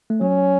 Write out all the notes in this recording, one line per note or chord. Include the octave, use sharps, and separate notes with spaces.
A3
F#3 C#4